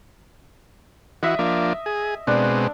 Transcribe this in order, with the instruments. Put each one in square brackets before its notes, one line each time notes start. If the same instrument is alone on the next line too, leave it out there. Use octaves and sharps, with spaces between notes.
[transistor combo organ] E3 F#4 [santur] D#5 E5
[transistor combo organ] F3 A#3 D4
G#4
[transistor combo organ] B2 G#3 C4 [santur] D4